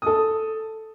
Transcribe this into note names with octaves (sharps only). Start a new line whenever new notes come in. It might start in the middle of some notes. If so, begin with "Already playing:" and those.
A4 D#6